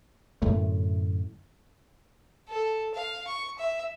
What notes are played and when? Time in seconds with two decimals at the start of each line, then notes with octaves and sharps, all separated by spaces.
0.42 F#2 A2 D3 A3
2.49 A4
2.95 F5
3.27 C#6
3.59 E5